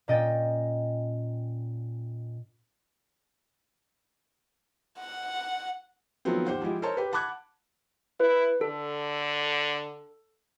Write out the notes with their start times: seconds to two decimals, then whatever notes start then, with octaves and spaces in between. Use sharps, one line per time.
0.08 A#2 C#4 D#5 G5 A6
4.99 F#5
6.25 D#3 F3 F#3 A3 B3 C4
6.47 D#2 G4 C5 F#5
6.62 F3 G#3 E4 G4
6.82 A4 A#4 C5 C#5 A5 C6
6.97 G4 B4
7.13 F#5 A5 B5 D6 F#6 G#6
8.20 E4 B4
8.61 D3 A4